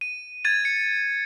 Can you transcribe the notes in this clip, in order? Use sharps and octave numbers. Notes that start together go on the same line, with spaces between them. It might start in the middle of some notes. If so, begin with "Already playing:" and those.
D#7
G#6 A6 D#7
C#7